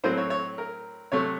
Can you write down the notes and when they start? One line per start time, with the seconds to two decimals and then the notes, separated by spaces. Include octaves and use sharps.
0.04 A2 F#3 C4 C5
0.17 C#5
0.30 C#5
0.58 A#4
1.12 C3 F#3 A3 C#5